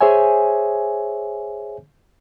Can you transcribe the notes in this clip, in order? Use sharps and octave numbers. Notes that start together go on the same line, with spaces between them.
G#4 C5 C#5 E5 G#5